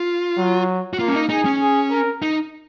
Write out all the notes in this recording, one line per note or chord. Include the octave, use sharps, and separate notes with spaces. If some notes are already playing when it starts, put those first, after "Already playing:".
Already playing: F4
F#3
F#4
A#3 F4
C#4
D#4
D#4 G#4
C#4
G#4
A#4
D#4